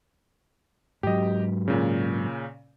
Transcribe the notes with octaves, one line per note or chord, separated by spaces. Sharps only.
G#2 F#3 G4 D#5
A#2 C#3